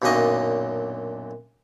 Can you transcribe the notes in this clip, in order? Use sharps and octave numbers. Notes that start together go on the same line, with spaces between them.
B1 F#2 A#2 D3 D#5 C#6